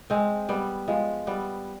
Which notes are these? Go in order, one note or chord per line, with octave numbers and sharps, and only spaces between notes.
G#3 C4
G3 B3
F3 G#3
G3 B3